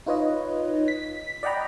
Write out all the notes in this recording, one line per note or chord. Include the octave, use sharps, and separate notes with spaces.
D#4 F4 B4 C#5 D#5
B6
D5 D#5 F#5 G5 A#5 B5